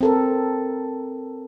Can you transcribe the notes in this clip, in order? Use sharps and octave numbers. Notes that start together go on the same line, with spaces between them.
C4 A4 A#4